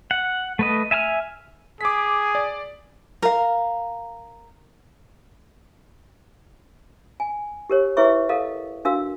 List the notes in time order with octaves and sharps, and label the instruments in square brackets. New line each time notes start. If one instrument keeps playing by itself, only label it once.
[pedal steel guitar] F#5
A3 B4 D#5
E5 G#5 A5 F6
[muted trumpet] G#4 [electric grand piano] D6 B6
[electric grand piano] D5
[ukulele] A#4 F5
[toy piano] G#5
G4 A#4 C#5
E4 G#4 B4 C#5 E5 C#6
A4 A#4 D#5 F5
D4 F#4 A#4 F5 E6